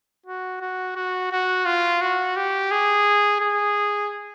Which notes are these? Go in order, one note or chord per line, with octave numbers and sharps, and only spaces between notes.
F#4
F#4
F#4
F#4
F4
F#4
G4
G#4
G#4